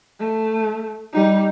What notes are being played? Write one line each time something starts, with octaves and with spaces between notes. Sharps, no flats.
A3
G3 D#4